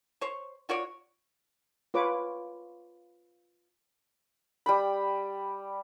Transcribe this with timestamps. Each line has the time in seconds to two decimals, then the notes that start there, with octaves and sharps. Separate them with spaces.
0.21 C5 C#5
0.69 F4 F#4 C#5 D5
1.94 F4 B4 C#5 D6
4.66 G3 G5 B5